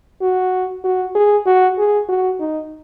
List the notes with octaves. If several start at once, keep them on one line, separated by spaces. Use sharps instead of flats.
F#4
F#4
G#4
F#4
G#4
F#4
D#4